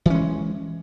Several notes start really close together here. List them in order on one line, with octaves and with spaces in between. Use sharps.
E3 C#4 G#3